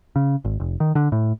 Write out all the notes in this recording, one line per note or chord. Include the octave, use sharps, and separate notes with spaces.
C#3
G#1
F1
D#3
D3
A2